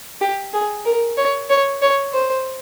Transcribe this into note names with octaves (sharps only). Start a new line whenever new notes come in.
G4
G#4
A#4
C#5
C#5
C#5
C5